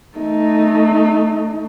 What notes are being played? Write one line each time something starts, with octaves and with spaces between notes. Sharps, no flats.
A3 D#4